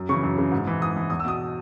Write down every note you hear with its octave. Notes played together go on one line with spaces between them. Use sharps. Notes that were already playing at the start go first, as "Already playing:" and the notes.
Already playing: F#2
C#3 E3 C#6
F#2
C#3 E3
G#2
E3
G#2 D#6
E3
E2 D#6
E6
B2 D#6